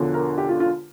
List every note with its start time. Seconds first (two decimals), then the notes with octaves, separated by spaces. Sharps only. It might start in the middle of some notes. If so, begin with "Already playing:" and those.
Already playing: E1 E2 D3 F3
0.14 A#4
0.38 G4
0.49 F4
0.60 F4